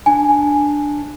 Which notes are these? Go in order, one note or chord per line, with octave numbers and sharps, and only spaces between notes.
D4 G#5